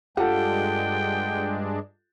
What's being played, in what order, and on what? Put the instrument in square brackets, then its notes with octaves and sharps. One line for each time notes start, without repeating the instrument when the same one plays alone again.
[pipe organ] G2 G#3 D4 [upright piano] F4 A4 [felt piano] G4 F#5 [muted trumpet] G5